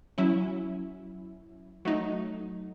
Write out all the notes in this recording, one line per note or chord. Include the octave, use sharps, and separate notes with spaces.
F#3 C#4 E4
F#3 A3 D#4